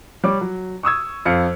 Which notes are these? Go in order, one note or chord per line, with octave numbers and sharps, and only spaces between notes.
G3 C#5 D6
F#3
C#6 D#6 E6 G#6
F2 F5 F6 C#7